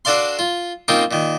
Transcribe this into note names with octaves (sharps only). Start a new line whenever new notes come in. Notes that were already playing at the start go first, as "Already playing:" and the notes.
D4 F#4 A4 D5 F5 C6
F4
A#3 C4 C#4 D#4 F4 A#4
A#2 D#3